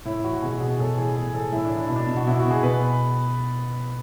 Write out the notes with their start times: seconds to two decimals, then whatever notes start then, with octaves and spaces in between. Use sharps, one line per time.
0.05 A2 E4
0.24 E3 F#4
0.42 B2 G#4
0.52 F#4
0.60 B2 G#4
0.79 A2 A4
0.97 E3 G#4
1.16 A2 G#4
1.34 E3 A4
1.52 A2 E4
1.65 D4
1.71 E3
1.77 D4
1.87 B2 E4
1.96 D4
2.08 B2
2.17 F#4
2.26 B2 E4
2.39 F#4
2.45 B2
2.51 G#4
2.63 B2 B4